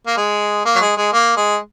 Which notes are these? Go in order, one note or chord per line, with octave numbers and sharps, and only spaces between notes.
A#3
G#3
A#3
F#3
G#3
G#3
A#3
G#3